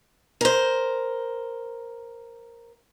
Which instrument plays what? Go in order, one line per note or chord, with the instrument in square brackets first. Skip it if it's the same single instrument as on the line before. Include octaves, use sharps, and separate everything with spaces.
[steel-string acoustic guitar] A#4 C5